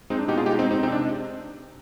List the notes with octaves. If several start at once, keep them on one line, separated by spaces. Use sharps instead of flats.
G#3 C4 D#4
D4
B2 D#4 G4
F4 G#4
G#3 D#4 G4
C4 D#4
G#3
C4 D#4
C3 C4 D#4
D4